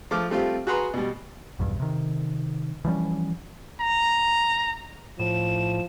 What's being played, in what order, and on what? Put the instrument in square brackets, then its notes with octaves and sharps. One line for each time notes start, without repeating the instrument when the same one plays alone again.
[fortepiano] F3 A3 D6 F6
G3 A3 C4 F4 G4
F#4 G#4 B4 F#5 A#5 C6
B2 G3
[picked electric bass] B1 E2 G2
C3 D#3
E3 F3 G3 C#4
[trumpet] A#5
[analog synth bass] A2 [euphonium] F3 [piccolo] E7